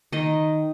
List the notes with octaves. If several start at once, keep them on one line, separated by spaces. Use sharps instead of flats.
D#3 D#4 D#5